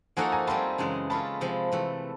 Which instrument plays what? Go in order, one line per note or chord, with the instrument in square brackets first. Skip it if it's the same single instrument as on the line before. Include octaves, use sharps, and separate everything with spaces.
[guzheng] F3 A#3 D#4 F#4 A4 [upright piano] F#5 G#5
[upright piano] G#5 A#5
[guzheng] G3 C4 F4 [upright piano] A5 B5
[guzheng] F#2 C#3 E3 G#3
[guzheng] G#3 C#4 F4 A4 [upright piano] A5 B5
[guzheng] C3 F3 G#3
C3 E3 A3